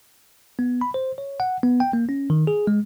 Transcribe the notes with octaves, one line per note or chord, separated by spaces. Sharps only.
B3
B5
C5
C#5
F#5
B3
G5
A#3
C#4
D#3
G#4
G#3